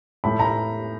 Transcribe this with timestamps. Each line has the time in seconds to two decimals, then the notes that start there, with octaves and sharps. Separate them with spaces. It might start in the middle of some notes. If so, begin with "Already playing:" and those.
0.24 A2 B5
0.39 A#5